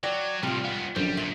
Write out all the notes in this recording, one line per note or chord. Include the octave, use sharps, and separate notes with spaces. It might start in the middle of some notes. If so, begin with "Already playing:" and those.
F#3 D5 G5
A2 C3 F3 G3 F4
C#2 B3 F5
A#1 F#2 D3 G3 C5
C#2 A#2 E5